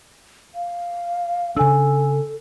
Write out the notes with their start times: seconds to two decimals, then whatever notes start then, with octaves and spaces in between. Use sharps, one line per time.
0.55 F5
1.57 C#3 D4 A4 G#5 E6